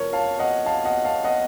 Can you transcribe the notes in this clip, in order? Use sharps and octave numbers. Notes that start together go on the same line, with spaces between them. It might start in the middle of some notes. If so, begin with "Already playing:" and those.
Already playing: C#3 F3 A#4 C#5
F5 A5
D#5 F#5
F5 A5
D#5 F#5
F5 A5
D#5 F#5